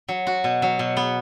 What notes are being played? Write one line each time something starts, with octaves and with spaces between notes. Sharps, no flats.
F#3
F#4
B2
F#3
B2
B3